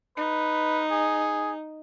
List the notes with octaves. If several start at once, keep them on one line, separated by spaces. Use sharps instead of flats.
D#4 B4
G#4